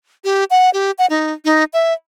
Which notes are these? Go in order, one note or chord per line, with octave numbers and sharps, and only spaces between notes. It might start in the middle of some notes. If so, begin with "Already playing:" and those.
G4
F#5
G4
F#5
D#4
D#4
E5